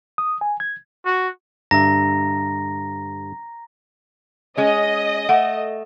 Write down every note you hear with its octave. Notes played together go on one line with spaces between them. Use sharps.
D#6
G#5
G#6
F#4
G2 D3 E5 A#5 A#6
G#3 C#4 D#5
A3 F#5